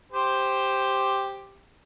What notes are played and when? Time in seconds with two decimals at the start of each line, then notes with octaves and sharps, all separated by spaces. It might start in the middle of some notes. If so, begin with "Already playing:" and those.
0.12 G4 C5